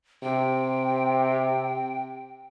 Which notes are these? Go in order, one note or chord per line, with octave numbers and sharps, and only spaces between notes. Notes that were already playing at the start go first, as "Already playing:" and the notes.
C3 G5